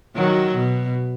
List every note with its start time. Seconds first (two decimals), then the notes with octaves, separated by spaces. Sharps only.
0.16 D#3 F#3
0.55 B2